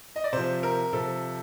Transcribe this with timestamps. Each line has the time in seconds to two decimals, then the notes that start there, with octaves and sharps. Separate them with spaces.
0.16 D#5
0.24 D5
0.33 C3 F3 C5
0.63 A#4
0.93 C3 F3 A4